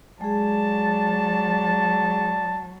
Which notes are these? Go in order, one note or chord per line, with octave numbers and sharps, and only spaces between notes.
F#3 G#3 G#4 D5 A5